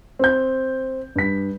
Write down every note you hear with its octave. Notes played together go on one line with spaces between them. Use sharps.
C4 G6
G2 B6